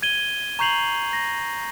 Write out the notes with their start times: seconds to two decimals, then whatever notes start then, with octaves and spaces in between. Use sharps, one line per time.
0.03 G#6 D#7 G7
0.59 A#5 C#6 G6 C7 F7 F#7
1.13 A#6